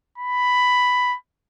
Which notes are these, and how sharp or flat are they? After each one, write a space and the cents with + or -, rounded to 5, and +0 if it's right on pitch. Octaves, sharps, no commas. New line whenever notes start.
B5 +5